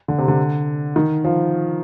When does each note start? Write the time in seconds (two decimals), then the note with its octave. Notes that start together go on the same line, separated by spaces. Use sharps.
0.08 D3
0.19 C3
0.28 D3
0.96 D#3
1.24 F3